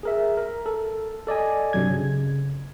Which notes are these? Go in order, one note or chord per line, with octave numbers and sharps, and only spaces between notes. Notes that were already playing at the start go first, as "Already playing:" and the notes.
G#4 A#4 E5
A#4
A4
A4 D5 D#5 G#5
G2 C3 F#3 G#6
C#3